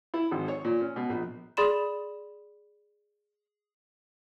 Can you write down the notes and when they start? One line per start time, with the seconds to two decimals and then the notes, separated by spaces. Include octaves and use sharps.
0.14 E4
0.31 G#1
0.48 C#5
0.65 A#2
0.81 C#4
0.96 B2
1.09 A#1
1.57 G#4 D5 B5 C6 E7